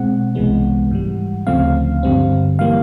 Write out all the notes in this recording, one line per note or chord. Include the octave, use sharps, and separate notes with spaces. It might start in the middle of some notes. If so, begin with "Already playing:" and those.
Already playing: B2 G#3 C4 F#5
C2 C3 E3 G#3 B3
G#2 E3 G3
D2 C#3 F3 A3 C4 F5
G2 D3 G3 C4
E3 G3 A#3 F5